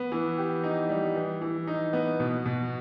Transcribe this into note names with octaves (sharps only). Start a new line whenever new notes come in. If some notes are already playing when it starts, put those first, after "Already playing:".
Already playing: B3
E3
G4
D#4
G3
E3
E3
D#4
B3
B2
B2